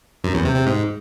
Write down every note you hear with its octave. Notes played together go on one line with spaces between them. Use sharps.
F#2
E2
C3
C3
G#2